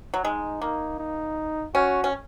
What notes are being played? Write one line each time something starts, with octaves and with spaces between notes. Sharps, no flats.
F#3
G#3 D#4
A#3 D#4
D#4
C#4 F#4
C#4